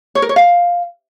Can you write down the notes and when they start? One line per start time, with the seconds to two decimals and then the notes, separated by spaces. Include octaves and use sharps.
0.15 C#5
0.22 A#4
0.29 C#5
0.36 F5